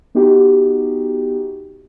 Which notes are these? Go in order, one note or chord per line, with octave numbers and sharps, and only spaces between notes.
B3 D#4 F#4 G4